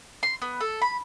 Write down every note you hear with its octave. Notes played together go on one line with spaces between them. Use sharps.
C6
B3
A4
B5